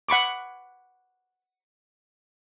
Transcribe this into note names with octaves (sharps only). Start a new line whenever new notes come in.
F#5 B5 C#6 D6